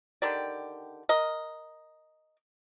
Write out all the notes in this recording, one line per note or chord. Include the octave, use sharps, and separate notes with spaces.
D3 D#3 G4 D5
A#4 D#5